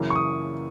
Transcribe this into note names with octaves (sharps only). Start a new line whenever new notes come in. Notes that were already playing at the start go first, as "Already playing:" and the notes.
Already playing: F#2 C#3 E3 A#3
C#6
D#6